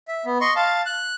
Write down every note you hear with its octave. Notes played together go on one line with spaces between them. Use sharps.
E5
B3
D#5 C6 C#6
F5 A5
F#6